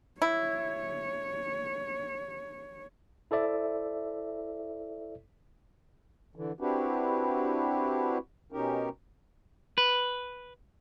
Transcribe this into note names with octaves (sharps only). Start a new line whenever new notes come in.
E4 C#5
E4 A4 C5 D5 E5
D3 E3
C4 D4 E4 F#4 G4 B4
B2 C#4 D#4 G4 A#4
B4